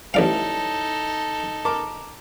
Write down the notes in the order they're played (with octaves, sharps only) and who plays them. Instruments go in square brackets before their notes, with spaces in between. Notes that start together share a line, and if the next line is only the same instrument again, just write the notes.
[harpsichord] A1 D5 F5 [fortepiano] G3 E4 C#5 [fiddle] D#4 A4
[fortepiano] A#4 A5 D6